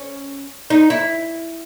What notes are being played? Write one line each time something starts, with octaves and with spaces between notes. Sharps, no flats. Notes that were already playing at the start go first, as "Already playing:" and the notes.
Already playing: C#4
D#4
E4